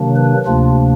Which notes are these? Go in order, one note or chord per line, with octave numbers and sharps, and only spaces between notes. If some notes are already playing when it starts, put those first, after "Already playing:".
Already playing: C3 D#3 F#3 A#3 D4
B4
D2 C3 F3 A#3 D4 F4